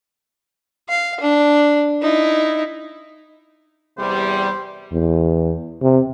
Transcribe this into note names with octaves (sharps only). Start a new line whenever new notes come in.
F5
D4
D#4 E4
E2 C3 G3 C5
E2
C3